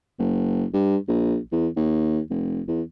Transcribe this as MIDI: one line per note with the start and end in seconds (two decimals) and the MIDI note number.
0.19 0.64 30
0.74 0.97 43
1.08 1.37 34
1.52 1.67 40
1.76 2.19 39
2.30 2.61 29
2.68 2.82 40